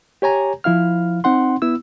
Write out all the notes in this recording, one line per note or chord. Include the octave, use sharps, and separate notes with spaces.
G4 C#5 G#5 A#5
F3 E4 F5 F6
C4 D#4 F#5 C6
B3 E4 E6